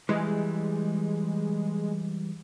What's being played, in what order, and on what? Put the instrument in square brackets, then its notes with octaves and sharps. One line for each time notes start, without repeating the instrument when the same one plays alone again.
[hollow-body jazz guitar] E3 G3 [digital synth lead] G#3